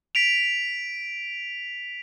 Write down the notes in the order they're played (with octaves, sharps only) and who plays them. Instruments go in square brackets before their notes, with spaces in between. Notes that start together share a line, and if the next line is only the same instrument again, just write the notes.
[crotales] B6 D7 F7